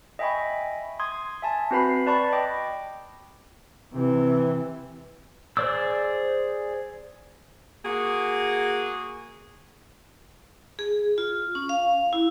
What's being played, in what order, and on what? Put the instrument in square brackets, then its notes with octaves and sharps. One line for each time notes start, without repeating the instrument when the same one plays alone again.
[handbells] D#5 E5 G5 G#5 B5 C#6
C6 D#6 G#6
E5 G#5 A5
C4 F#4 B4 B5 C7
B4 D5 A5 B5 C#6
D#5 G5 D6
[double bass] C3 E3
[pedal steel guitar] G#4 C5 D5 D6 E6
[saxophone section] A#3 F#4 G#4
[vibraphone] G#4
F4
C#4
F5
E4